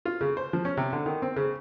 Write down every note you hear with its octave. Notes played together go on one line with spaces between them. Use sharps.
F4
C#3
C5
F3
C#4
C3
D3
D#3
C4
C#3